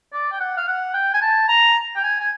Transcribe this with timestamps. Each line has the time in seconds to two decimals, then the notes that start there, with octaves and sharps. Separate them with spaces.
0.13 D5
0.32 G5
0.40 F#5
0.57 F5
0.68 F#5
0.94 G5
1.14 G#5
1.22 A5
1.48 A#5
1.96 G5
2.03 G#5
2.20 G#5